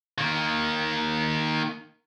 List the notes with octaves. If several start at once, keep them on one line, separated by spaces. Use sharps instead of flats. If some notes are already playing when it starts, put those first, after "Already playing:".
D#3 A#3